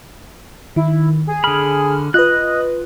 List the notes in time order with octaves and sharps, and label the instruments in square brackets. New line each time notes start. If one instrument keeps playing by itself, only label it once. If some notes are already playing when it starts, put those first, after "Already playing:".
[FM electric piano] D#3 [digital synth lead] E4
[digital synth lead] G#4
[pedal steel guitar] D3 B5 [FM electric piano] F6
[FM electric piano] F4 B4 [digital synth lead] D#5 [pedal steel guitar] F#6